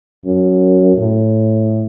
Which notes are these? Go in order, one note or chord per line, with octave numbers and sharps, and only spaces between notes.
F#2
A2